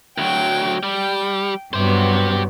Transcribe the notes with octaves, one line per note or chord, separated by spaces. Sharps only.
D2 F#3 G5
G3 G5
G2 F#3 B3 G4 C5